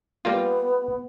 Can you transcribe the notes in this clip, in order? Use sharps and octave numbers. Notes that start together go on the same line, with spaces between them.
G3 A#3 B3 F4